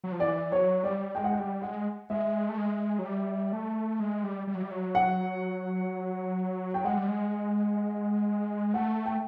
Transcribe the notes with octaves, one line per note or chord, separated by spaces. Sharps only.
F#3
F3
E3 D5
F#3 C#5
G3 D5
G#3 G5
F#5
G5
G3
G#3 F#5
G#3 E5
A3
G#3
F#3
G3
A3
G#3
G3
G3
F#3
G3
F#3
F#5
G5
G#3 F#5
G3
G#3
A3 F#5
G5